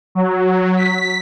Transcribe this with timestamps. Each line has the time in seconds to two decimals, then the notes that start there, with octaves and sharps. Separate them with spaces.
0.15 F#3
0.76 B6